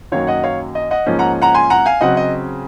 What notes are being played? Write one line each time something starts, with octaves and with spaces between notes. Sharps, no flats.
F#2 D#3 F#3 A#3 C#5 F5
D#5 F#5
C#5 F5
D#5
D#5 F#5
G#2 F3 A#3 C#4
F#5 A#5
F#5 A#5
G#5 C6
F#5 A#5
F5 G#5
C#3 F#3 C4 D#5 F#5
D#5